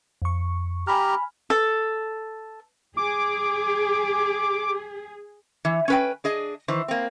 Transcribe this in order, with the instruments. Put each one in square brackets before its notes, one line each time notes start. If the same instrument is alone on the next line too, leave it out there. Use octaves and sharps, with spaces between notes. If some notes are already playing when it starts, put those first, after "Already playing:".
[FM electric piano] F2 C#6
[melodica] G4 A#5 [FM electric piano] G#5 B5 F6
[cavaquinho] A4
[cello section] G#4 [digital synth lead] D6
[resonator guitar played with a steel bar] E3
C#4 B4 G5
D4 G#4 D#5
D#3 E3 C5
A#3 C4